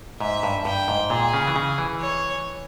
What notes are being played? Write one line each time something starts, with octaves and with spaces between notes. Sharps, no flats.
G#2 E5
G2
G2 G5
G#2
A#2 G#4
C#3
E3
C#3
E3
C#5